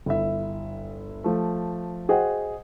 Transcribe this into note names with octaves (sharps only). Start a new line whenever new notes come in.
G1 E4 E5
F3 A3
F#4 G#4 C5 D#5 F#5 G5